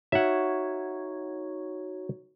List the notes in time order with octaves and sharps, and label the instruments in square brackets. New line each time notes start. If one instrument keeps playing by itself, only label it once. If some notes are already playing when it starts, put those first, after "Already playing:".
[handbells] D#4 F#4 C#5 [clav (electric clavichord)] E5 F#5